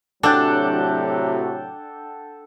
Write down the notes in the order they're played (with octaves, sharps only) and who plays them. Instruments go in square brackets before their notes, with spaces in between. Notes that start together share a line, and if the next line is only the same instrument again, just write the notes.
[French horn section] A2 C3 F#3 [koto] D4 [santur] A4 F#5 G5